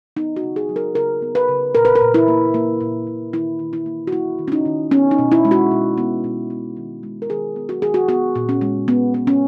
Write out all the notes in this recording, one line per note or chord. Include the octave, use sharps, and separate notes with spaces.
B3 D#4
F#4
C#3
G#4
F#3
A#4
C#3 A#4
B3
B4
C#3
A#2 A#4
B4
A#4
A#2
E4
A#3
A#3
A#2
A#2
D#3 E4
D#3
E4
A#3
F#4
A#3 E4
D#3
C#4
D#4
D#3
B3 C#4
D#4
B2
E4
G#3
F#4
B2
B3
B2
B3
D#3
G#3
A#4
D#3 G#4
B3
F#4
D#3 G#4
F#4
B3 F#4
A#2
C#4
G#3
A#2 B3
B3
C#4